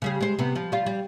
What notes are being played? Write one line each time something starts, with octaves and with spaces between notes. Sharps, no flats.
C#3 G3 G#4
G#3 C5
C3 B3
F3
G3 F4
G3